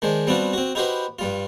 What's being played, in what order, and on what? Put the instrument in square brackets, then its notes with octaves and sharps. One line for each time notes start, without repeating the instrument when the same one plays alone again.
[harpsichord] D#3 G#3 D4 C5
G3 B3 C4 D4 F4 F#4
C4 F#4
D#4 E4 F#4 G4 B4 C5
G2 G3 F4